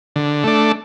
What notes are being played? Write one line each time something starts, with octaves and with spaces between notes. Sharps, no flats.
D3
A3 D4